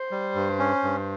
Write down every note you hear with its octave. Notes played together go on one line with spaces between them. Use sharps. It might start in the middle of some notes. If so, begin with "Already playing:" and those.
Already playing: C5
G3
G2
C#4
G2